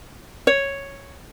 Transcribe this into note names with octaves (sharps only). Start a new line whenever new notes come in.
C#5